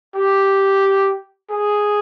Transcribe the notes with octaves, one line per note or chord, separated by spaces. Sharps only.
G4
G#4